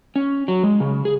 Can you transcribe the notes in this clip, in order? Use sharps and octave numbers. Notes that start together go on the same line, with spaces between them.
C#4
F#3
G#3
C#3
G#4